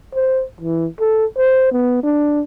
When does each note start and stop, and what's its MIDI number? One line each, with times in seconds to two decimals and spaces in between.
0.15 0.43 72
0.61 0.86 52
1.00 1.25 69
1.37 1.69 72
1.72 2.00 59
2.03 2.41 62